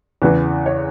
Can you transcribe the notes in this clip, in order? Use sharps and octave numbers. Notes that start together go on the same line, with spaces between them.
E2 C#3 E3 B4
C#5